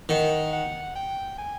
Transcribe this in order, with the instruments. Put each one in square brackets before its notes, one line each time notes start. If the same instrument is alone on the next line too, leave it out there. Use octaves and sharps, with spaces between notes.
[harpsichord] D#3 [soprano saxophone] F#5
[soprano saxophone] F#5
G5
G#5